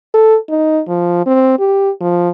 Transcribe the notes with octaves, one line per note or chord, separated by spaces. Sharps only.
A4
D#4
F3
C4
G4
F3